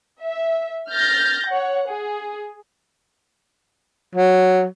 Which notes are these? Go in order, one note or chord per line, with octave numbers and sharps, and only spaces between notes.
E5
F6 G6 A6 A#6
C#5 F#5
G#4
F#3